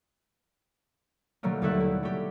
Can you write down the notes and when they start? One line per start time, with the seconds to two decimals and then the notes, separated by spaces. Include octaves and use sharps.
1.43 B2 D#3 F#3 G3 A3 A#3
1.62 D#2 D3 G3 A4 E5 F#6
1.80 E4
2.03 G3 A3 F#4 G4